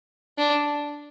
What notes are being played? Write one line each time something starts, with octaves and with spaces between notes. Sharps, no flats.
D4